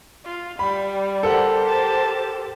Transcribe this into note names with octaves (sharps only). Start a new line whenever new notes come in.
F4
G3 B5
G4 A4 A#4 C5 F#5
A5